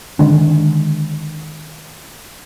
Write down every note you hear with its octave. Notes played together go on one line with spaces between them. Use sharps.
D3 D#3 G#3 D4